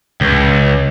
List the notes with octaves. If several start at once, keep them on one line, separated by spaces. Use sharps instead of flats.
C#2